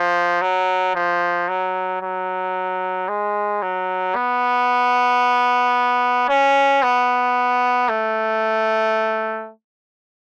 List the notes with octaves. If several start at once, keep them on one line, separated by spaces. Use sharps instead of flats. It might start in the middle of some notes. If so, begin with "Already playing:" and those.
Already playing: F3
F#3
F3
F#3
F#3
G#3
F#3
B3
C#4
B3
A3